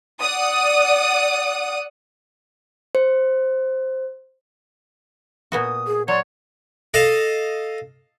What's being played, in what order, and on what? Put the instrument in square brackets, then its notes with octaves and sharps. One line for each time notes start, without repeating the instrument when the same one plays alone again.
[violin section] D5 F#5 D#6
[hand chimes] C5
[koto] A#2 B3 F#4 [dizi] D#6
[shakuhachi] G#4
[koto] F#3 [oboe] C#5 [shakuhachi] D5 [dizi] C6
[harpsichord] A4 D#5 F5